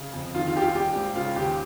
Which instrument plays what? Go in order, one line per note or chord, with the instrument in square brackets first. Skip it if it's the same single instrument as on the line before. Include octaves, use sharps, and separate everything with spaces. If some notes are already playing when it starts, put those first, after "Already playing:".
Already playing: [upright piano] C#3
F2
D#3 F4
F4
D#2 G4
F4
G3 G4
G#2
C#3 F4
D#2 G4